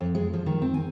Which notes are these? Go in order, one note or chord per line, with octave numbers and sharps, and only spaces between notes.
F2
G#3
F3
D#3
C4
G#5